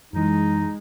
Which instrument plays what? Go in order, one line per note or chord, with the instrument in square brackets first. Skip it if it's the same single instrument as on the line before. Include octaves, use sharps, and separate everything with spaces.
[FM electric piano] F#2 E3 [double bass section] G#3 [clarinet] D#4